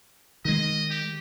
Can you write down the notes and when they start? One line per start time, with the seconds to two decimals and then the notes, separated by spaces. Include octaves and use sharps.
0.45 D#3 G#3 D#5
0.90 G4